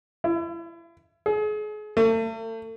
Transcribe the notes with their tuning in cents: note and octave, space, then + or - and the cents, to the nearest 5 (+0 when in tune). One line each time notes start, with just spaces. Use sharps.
E4 +35
G#4 +35
A3 +40